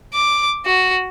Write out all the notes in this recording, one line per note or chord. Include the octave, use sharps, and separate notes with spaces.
D6
F#4